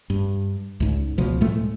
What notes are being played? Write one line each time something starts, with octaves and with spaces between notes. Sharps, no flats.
G2
C#2 G#2
C#2 B2 F3
A2 G#3 A3